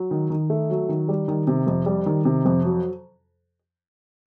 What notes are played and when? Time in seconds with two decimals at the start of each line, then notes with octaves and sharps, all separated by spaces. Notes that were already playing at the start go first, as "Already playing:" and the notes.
Already playing: F#3
0.11 D#3
0.30 D#3
0.50 A3
0.70 F#3
0.89 D#3
1.08 G3
1.28 D#3
1.47 C3
1.67 F2
1.86 G3
2.06 D#3
2.25 C3
2.45 F2
2.65 F#3